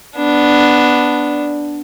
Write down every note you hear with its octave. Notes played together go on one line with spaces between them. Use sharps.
B3 D4